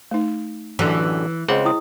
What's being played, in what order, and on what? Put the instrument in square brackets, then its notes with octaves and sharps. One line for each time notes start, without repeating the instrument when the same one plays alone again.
[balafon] A3 D#4
[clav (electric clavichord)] A1 F#2 D3 [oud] E3
[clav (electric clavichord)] C#2 C4 F#5 [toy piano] G#4 C5 D#5
[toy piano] E4 G5 D#6